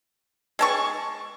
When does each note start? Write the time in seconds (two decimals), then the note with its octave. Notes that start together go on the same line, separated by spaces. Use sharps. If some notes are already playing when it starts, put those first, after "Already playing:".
0.59 G#3 A5 C#6